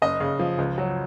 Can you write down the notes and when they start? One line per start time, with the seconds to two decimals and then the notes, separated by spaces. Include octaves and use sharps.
0.02 F#1 D#5
0.20 C#3
0.39 F3
0.58 C#2
0.78 F#3